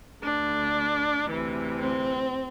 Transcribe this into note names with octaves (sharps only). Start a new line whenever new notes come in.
D2 D3 D4
D2 C3 E3
C4